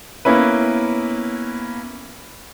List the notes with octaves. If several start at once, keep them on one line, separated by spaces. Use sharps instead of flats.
A#3 B3 C#4 E4 B4